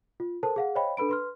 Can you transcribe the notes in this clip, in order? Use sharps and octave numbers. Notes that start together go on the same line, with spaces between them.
F4
A4 A#4 C5 A5
G#4 F5 F#5
C5 C#5 D#5 F5 G5 B5
D4 A4 B4 B5 D7
B4 C6 F6